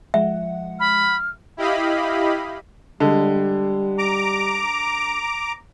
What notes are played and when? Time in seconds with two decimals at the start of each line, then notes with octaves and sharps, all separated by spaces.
0.14 F3 G#3 E5 F#5
0.80 B5 F6
1.57 E4 G4 D#5 F5 B5
3.00 D3 G3 G#3
3.98 A#5 D6